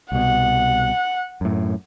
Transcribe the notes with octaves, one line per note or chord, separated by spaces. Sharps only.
C2 B2 F#5
F#2 A2